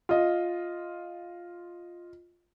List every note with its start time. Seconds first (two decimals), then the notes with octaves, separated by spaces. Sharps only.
0.09 F4 D#5